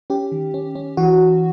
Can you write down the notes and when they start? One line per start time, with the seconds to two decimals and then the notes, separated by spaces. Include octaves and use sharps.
0.10 C#4 G4
0.32 D#3
0.54 C#4
0.75 C#4
0.97 E3 F#4